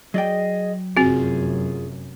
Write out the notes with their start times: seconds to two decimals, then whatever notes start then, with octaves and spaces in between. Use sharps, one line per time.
0.14 F#3 G#4 D5 D#5 G5
0.97 F1 F#2 C4 F4 F#4 G#4